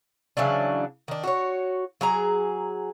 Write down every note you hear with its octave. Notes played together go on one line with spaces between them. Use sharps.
C#3 E3 F#3 D4
D#3 D4
F#4 A#4 C#5
F#3 G#4 A#5